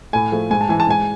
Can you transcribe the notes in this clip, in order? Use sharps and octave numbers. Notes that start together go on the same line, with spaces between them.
A2 G#5
F3 A3
G#2 G#5
A5
E3 G#3 G#5
A5
G#2 G#5